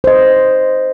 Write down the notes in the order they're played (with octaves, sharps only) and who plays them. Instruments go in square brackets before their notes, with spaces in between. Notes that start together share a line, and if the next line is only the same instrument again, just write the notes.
[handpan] C5 D#5